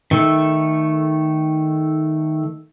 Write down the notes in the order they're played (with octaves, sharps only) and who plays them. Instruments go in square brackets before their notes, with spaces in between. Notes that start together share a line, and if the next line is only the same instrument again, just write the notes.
[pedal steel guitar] D#3 A3